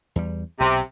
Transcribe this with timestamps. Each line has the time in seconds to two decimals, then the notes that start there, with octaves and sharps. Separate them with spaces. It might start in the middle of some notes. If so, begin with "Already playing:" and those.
0.16 E2 G3
0.60 B1 C3